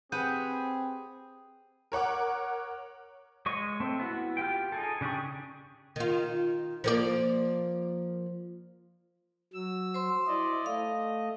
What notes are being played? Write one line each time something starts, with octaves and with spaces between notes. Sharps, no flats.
C4 G4 G#4 B4 F#5 G6 D#7
A#4 C#5 F#5 D6
G#3 C#5 D#5 C#6
A3 C4
B3 E4 F#4
F4 G4 G5
D#4 G#4 A4
C#3 D4 G4 G#4 C#6
D#3 F4
F3 A#3 D5
F#3 E6
C5 C6
E4 D5 D#5
A3 D#5 F5